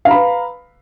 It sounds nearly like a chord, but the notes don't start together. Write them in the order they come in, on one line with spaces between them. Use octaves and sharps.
F5 A#5 B5 B4